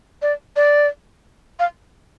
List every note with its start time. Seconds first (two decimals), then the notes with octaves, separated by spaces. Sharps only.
0.22 D5
0.56 D5
1.59 F5